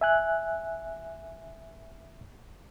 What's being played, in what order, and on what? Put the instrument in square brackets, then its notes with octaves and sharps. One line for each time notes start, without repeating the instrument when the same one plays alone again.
[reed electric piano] E5 G#5 F#6